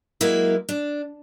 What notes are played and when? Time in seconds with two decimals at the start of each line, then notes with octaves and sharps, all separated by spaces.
0.21 F#3 G#3 A#3 E4 A#4
0.69 D4